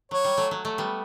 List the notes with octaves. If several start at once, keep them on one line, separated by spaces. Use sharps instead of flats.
F#3 C#5
G3
F#3 A3
F#3
F#3 A3
G3 B3